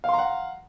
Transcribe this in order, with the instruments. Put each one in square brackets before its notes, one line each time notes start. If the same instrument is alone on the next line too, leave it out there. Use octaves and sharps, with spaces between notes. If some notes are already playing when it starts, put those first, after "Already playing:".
[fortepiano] F5
C6
A#5
F#5